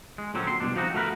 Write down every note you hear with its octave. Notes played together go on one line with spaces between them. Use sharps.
G#3
A#2 D3 F#3 C4 C#4
C6
C2 B2 D4
F3 C4 D#4 F#4
A3 F#4 A#4 B4